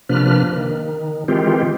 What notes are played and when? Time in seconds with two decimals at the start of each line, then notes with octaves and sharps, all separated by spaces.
0.09 C3 F3 A#3 D4 B4 F6
0.53 D#3
1.28 D#3 E3 G#3 C4 F4 G4